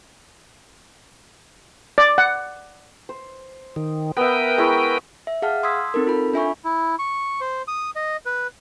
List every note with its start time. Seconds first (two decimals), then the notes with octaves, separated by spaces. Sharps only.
1.98 D5
2.18 F#5
3.09 C5
3.76 D#3
4.17 B3 A#4 B4 E5 G5
4.58 G#3 E4 C#6
5.27 E5
5.42 G#4 F5 F#5 A5 F6
5.63 C6 D#6 E6 G#6 B6
5.94 C4 D#4 A4 A#4
6.07 F4 A4 B5
6.34 D4 F4 E5 G#5 B5 C#6
6.65 E4
6.99 C#6
7.41 C5
7.68 D#6
7.96 D#5
8.26 B4